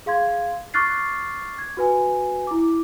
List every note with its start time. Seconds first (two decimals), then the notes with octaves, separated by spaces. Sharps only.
0.06 G#4 F5 C6 G#6
0.74 C#6 D6 F6 F#6 A6 C7
1.58 G#6
1.77 F#4 B4 G#5
2.47 E4 D6